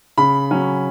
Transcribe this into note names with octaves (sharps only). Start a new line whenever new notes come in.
C#3 B5
F#3 C#4